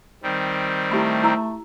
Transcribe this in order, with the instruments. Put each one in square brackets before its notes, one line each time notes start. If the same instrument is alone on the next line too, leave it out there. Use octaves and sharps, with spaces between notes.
[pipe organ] D#3 G3 C4
[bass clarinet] A3 [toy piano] E4 G4 B5
[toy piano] E4 A#5 E6